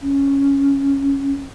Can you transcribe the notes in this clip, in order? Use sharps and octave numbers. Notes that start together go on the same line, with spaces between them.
C#4